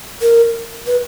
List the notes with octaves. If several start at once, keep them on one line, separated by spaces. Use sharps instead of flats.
A#4
B4